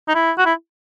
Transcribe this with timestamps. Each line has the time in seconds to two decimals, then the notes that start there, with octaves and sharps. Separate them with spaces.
0.08 D#4
0.15 E4
0.38 F#4
0.46 E4